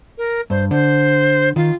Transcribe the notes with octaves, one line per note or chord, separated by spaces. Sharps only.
A#4
G2 C5
D3 C5
D#3 F4